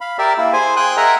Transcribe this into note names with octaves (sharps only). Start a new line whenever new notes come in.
F5 B5
G4 A#4 D5 E5
A#3 E4
G#4 C5 G#5
G5 G#5 D#6 F#6
G#4 A#4 D#5 E5 F#5 A#5